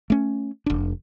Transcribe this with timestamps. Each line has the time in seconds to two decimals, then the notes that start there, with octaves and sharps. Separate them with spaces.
0.10 A3 C#4
0.66 F1 D4